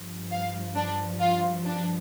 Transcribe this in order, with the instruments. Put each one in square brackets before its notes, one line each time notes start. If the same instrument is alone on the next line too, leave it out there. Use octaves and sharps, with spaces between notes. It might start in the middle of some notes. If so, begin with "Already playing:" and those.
Already playing: [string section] G2 F3
F5
D4
F4
D4